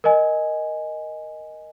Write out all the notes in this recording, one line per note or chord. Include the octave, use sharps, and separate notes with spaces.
A#4 D#5 G#5